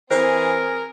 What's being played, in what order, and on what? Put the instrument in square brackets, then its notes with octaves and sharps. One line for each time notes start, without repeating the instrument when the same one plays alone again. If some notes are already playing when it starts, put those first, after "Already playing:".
[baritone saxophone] E3 [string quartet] C4 G#4 [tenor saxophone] A#4 [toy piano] C5